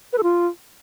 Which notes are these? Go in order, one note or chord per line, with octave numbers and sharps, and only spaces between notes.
B4
A4
F4